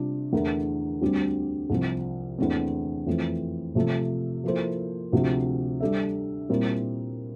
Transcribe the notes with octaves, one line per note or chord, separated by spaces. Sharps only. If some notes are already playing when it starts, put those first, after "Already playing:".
Already playing: C3 G3 D4 F4
E2 D3 A3 E4 A#4
D2 D3 G3 C4
C2 C3 F3 C4
E2 D3 A3 C4
F2 E3 A3 C4
C3 F3 A3
F3 A#3 E4 A4 C5
D2 C3 F3 C4 G4
G3 D4 A4 E5
A#2 G3 C4 E4 A#4